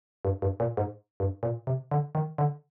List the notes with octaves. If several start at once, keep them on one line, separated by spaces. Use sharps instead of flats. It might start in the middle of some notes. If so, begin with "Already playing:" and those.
G2
G2
A#2
G#2
G2
A#2
C3
D3
D#3
D3